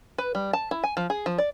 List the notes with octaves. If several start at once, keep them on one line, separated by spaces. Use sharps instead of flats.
B4
G3
A5
E4
G#5
F3
G#4
F3
D5